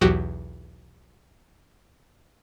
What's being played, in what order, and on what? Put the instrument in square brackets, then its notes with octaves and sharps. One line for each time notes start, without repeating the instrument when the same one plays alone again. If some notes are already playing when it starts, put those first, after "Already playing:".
[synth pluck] B1 E2 F#3 F#4 G4